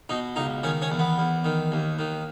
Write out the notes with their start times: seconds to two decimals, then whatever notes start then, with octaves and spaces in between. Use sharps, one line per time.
0.09 B2 D#4
0.36 C#2 D#4
0.64 D#3 C#4
0.82 C#4
0.90 E2
0.99 B3
1.18 E2
1.44 D#3
1.72 D#2
1.99 D#3